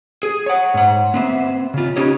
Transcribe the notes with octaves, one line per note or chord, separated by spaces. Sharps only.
G#4
C#5 F#5
G#2 F#5
B3 C4 E5
C#3 F4
B3 C#4 D#4 G4 C#5